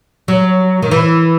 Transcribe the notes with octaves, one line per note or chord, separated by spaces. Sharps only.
F#3
D#3
E3